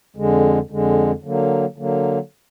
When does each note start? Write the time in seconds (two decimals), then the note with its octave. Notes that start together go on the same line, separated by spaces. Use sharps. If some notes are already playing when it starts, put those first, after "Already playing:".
0.16 F2 D3 G#3
0.70 F2 D3 G#3
1.22 D3 F#3 A#3
1.76 D3 F#3 A#3